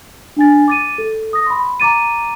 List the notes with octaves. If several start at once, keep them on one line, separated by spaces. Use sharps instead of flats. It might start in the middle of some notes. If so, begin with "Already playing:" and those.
D4 G#5 A6
D6 A6 D#7
A4
D#6 A#6
B5 C6
A#5 D6 A6 D#7